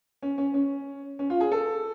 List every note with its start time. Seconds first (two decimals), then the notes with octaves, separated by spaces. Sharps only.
0.23 C#4
0.38 C#4
0.54 C#4
1.19 C#4
1.30 F4
1.40 G#4
1.52 A4